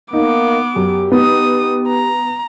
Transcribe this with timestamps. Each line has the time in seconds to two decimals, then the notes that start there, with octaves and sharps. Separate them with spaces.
0.13 A#3 B3 D#4 D6
0.76 F#2 G4
1.12 B3 D#4 D#6
1.88 A#5